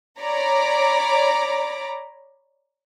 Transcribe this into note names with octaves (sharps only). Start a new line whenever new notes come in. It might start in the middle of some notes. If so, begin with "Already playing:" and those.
C#5 D5 A#5 B5 D6